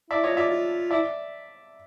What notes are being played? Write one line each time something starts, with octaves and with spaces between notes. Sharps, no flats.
E4 D5 E5
F4 C#5 D#5
F4 D5 E5
F4
E4 D5 E5